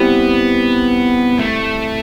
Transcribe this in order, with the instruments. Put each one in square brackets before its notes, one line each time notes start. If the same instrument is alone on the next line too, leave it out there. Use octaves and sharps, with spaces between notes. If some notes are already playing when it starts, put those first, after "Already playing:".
Already playing: [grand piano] G3 C4 E4 G4 [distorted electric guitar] B3
[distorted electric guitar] A3